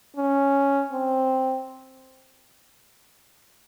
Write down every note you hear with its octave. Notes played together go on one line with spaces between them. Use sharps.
C#4
C4